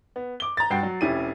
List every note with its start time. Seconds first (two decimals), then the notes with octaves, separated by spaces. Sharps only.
0.16 B3
0.40 D6 G7
0.57 A#5 A6
0.70 G2 F#4 G5 C7
0.83 F#3
1.01 F1 C#4 E4 G4 D#7